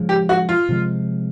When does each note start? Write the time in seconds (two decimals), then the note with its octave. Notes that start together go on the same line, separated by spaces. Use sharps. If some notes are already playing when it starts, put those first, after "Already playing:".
Already playing: C#3 F3 G#3
0.09 G4
0.29 F#4
0.49 F4
0.69 C3 F3 G#3